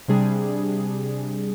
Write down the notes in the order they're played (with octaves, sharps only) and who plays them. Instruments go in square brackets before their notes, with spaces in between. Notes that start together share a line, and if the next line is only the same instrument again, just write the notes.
[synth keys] C3 G3 D4 G#4